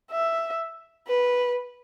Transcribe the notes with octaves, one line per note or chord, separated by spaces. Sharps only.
E5
B4